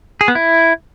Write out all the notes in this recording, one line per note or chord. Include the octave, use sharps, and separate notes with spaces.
G#4
B3
E4